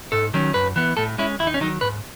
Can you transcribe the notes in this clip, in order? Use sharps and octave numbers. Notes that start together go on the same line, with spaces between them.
G#2 A4
D#3 F#3 C#4
F#2 B4
E3 B3
A2 A4
G#3 C#4 E4
D#2 E4
D#4
C#4
D#3 F#3 D#4
G#2 B4